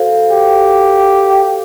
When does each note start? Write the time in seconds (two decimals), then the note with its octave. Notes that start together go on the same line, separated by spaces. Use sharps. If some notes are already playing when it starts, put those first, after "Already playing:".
Already playing: F#4 A4 C5 F5
0.31 G4